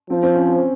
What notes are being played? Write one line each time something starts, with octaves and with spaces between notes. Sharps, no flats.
F3 C4
C4
C#4
C4